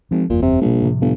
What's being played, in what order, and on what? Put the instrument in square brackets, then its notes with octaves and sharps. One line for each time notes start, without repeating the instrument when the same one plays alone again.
[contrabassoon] G#1 [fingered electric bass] F3
[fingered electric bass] F#1 E2 [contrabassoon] A#2
[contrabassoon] C3
[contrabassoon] A#1 [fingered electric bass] B2 G3
[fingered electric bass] A2 C3 F3
[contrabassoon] G1